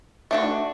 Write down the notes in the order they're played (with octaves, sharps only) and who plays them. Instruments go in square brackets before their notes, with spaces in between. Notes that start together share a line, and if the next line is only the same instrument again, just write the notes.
[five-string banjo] A3 D4 F#4